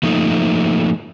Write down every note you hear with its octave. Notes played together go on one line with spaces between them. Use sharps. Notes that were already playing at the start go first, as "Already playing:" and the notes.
F3 A3 A#3 D#4